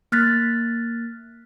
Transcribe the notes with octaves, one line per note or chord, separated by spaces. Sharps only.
A#3 F6 F#6 A6 B6